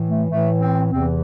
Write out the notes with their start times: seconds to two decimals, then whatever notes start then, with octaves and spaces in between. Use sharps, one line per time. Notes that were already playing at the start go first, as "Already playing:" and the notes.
Already playing: A2 E3
0.09 A3
0.29 A2 E3 A3
0.60 C4
0.91 E2 C3 E3 C4